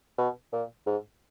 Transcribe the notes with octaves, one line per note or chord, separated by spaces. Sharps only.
B2
A#2
G#2